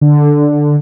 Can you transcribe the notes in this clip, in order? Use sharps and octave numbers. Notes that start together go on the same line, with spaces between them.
D3